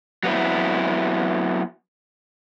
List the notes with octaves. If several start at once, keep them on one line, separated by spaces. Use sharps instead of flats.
F#3 B3 C4 E4